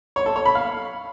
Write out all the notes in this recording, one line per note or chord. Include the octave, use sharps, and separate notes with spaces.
C#5
A4
C#5
B5
F5